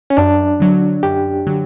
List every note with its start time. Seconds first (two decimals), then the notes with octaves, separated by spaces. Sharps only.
0.10 C#4
0.17 F#2 D4
0.60 D3 F#3
1.03 F#2 G4
1.47 D3 F#3